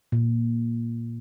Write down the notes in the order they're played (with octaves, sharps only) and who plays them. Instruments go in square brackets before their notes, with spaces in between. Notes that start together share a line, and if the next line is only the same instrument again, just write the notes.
[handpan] A#2